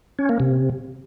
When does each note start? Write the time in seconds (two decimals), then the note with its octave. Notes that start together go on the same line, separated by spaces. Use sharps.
0.19 C#4
0.29 A#3
0.40 C3